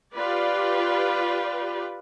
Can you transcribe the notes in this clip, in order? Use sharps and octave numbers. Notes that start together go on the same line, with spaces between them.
F4 G4 B4 D5